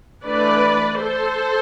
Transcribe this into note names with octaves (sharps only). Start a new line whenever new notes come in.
E3 A3 D4 B4 D5
A4 C5